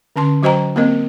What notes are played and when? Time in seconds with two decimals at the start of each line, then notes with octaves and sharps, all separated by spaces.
0.16 D3 C#4 A5 C6
0.43 F#3 F#4 C5 D#5 G5 A#5
0.76 A#3 C4 A#4 D#5